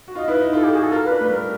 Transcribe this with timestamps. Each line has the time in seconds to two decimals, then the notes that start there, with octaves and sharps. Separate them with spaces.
0.08 F#4
0.15 F4 D#5
0.28 E4 B4
0.41 D#4
0.53 F4 A4
0.63 G4
0.73 F#4 G#4
0.82 A4
0.92 F4 A#4
1.05 B4
1.11 D4
1.17 A3 B4
1.30 G3 A#4